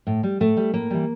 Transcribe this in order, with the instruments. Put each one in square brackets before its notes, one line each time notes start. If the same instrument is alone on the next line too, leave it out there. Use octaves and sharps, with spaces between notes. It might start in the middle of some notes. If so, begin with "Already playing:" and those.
[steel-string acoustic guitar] A2
G3
A2 A3
G3
A2 A#3
E3 G3